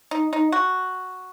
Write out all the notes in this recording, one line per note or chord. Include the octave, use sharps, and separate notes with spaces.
D#4
D#4
F#4